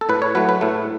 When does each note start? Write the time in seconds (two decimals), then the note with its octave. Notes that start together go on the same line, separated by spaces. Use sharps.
0.01 A4
0.09 A2 B4
0.22 C#5
0.35 F#3 A3 B4
0.49 B4
0.61 A2 A3